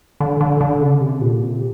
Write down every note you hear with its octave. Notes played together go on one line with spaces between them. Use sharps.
D3
D3
D3
C#3
C3
A#2
C3